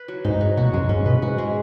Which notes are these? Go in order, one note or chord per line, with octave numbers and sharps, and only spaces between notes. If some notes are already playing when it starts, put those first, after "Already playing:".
Already playing: B4
F#3
G#2 D#4
F#3
B2 F#4
F#2 G#3
G#2 C#4
B2 B4
G#2 F#4
G#3